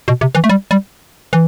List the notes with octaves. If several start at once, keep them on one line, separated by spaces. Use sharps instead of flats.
B2
C3
E3
A3
G3
G3
E3